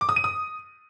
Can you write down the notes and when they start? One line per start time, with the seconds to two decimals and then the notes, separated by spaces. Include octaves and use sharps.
0.01 D6
0.09 D#6
0.16 D#7
0.24 D#6